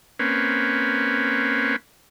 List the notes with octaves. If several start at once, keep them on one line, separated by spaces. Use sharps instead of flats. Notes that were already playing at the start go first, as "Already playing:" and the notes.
A#3 C4 C#4 B4